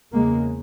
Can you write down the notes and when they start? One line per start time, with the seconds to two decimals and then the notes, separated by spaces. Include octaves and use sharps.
0.12 E2 C#3 G#3 A#3